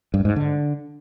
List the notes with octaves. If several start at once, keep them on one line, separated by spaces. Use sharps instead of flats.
G2
G#2
D3